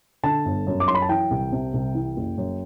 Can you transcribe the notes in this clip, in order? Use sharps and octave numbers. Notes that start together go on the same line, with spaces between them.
D3 A5
G1
F#2
D6
F#3 C6
B5
A5
E3 G5
C2
C3
C2
E3
F#1
F#2